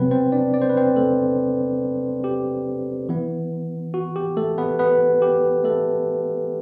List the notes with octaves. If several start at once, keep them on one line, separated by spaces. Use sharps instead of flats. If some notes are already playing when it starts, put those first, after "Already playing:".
Already playing: C3 F#3 B3 C4 B4
C4 C5
D4 D5
D5
C5
B4
C4 C5
A3 A4
G4
E3 B3
F#4
G4
A3 A4
B3 B4
B3 B4
G4
A3 A4